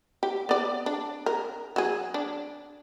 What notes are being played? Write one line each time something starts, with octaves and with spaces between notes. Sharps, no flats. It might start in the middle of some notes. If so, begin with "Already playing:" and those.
G4
B3 D5
D4
A#4
F#3 G#4
D4